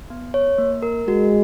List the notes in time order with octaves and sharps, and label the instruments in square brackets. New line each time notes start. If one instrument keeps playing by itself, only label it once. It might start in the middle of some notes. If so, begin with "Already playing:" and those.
[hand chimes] B3
C#5
A#3
A#4
[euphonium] G#3 [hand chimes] F#4